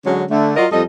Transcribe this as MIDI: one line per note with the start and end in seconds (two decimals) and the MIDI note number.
0.05 0.24 50
0.05 0.24 54
0.05 0.24 56
0.05 0.24 61
0.30 0.55 50
0.30 0.55 57
0.56 0.66 54
0.56 0.66 65
0.56 0.66 66
0.56 0.66 70
0.56 0.66 74
0.56 0.66 75
0.71 0.83 41
0.71 0.83 55
0.71 0.83 69
0.71 0.83 75